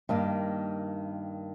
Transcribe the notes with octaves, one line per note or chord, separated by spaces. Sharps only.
G2 D#3 A#3